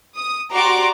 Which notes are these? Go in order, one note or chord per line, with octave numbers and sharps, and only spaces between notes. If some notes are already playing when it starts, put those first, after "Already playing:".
D#6
F#4 G4 D5 A#5 C6 D6